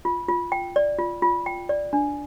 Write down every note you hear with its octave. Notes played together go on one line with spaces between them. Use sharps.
F4
F4
G5
D5
F4
F4
G5
D5
D4